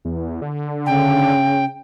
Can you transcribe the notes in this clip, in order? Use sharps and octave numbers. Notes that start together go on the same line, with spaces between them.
E2
D3
C#3 G5